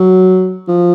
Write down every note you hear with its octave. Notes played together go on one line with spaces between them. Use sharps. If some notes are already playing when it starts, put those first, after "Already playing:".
Already playing: F#3
F3